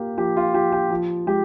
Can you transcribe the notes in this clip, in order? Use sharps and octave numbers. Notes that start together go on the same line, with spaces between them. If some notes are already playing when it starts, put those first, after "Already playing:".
Already playing: A#3 F4 G4
F3 G4
F4
F3 G4
G4
F3
G#3 G4